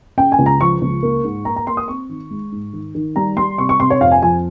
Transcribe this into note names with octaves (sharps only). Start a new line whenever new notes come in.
C#3 G5
G#5
C#2
A#5
F3 C#6
C#2
A#3
G#2
A#3 A#5
A#5
A#3 C6
D#6
C4 C#6
D#3
G#3
G#2
D#3
D#3
G3 A#5
G3 C6
C3 C#6
C#6
C3 C6
C#5
F2 F5
G#5
F3 G#5